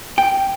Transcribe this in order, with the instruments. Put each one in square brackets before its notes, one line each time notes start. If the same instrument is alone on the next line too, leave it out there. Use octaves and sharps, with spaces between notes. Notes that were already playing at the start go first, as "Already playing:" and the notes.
[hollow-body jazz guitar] G5